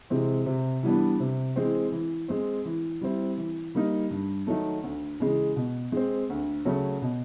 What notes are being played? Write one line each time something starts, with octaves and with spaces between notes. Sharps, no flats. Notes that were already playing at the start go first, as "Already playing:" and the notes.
C3 E3 G#3 C4
C3
E3 G3 B3 D4
C3
E3 G#3 C4
E3
G#3 C4
E3
G3 C4 E4
E3
G3 A#3 D#4
G2
D#3 F#3 A3
D2
C#3 E3 G#3
B2
G#3 C4
D2
C#3 F#3 A3 C#4
B2